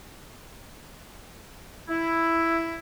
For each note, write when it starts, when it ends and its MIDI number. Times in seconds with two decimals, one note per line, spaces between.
1.88 2.77 64